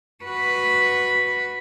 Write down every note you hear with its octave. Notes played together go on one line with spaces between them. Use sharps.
F#4 B4